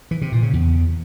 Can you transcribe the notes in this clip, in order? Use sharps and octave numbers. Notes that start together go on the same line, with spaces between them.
E3
C3
A#2
C#3
E2